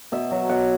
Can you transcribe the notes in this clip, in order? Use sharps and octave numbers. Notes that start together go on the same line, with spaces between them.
B2 E5
F#3
B2 F#5